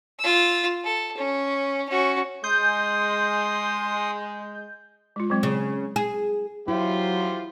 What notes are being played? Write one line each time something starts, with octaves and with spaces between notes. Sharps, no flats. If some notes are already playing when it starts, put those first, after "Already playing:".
F4 E6
A4
C#4
C#4 F#4
G#3 C6 D#6 G6
G#3 F4
F#3 G#3 C4
C#3
G#4
F#3 E4 F4 G4 C5